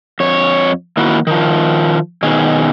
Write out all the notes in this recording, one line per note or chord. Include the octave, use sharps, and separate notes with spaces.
F2 C#5
D#3 A#3 E4 F#4
D#3 F3
B2 D#3 G#4